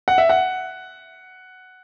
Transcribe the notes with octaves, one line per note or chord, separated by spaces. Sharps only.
F#5
E5
F#5